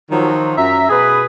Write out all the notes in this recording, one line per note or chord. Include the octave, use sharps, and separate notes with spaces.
D#3 F3 F#3
F#2 E5 A#5
B2 G#4 B4